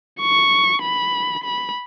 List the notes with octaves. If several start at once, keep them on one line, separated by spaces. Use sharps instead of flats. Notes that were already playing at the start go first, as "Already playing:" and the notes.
C#6
B5
B5